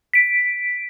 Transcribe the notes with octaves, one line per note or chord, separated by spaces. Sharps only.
B6 D7